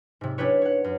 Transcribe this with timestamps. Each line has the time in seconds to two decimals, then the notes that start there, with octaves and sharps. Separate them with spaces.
0.21 G#2 C3
0.38 C#4 D4 E4 G4 B4 C#5
0.62 C#5 F#5
0.84 F#2